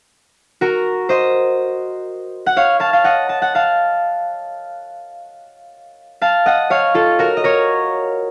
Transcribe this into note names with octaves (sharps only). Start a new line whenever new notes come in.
F#4 A#4
C5 D#5
F#5
C#5 F5
F5 A5
F5
D#5 F#5
A5
F#5
F5 A5
F5 A5
D#5 F#5
C#5 F5
F4 A4
F#4 A#4
D#5
A#4 C#5